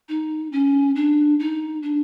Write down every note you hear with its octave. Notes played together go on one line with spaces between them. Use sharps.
D#4
C#4
D4
D#4
D4